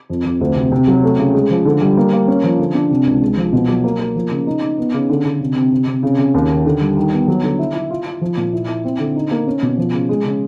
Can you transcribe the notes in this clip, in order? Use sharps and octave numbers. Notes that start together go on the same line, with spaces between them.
F2
F2
D2
C3
C3
F#3
A3
C#3
G#3
F3
D3
G3
A#3
A#3
C#4
F3
D3
D4
C3
C#2
G#3
F3
B2
F#3
A#3
A#3
F3
C#3
D#4
D#4
B3
C#3
D3
D3
C3
C3
C3
C3
C#3
C#3
D#2
D#3
D3
G3
D#3
B3
F#3
D3
E4
E4
F4
F4
F3
A#2
E4
E4
C4
D3
D#4
A#3
C#4
B2
F3
C#3
G#3
C#3